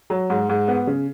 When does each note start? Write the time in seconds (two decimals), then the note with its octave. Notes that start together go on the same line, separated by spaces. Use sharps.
0.10 F#3
0.30 G#2
0.49 G#2
0.68 B3
0.87 C#3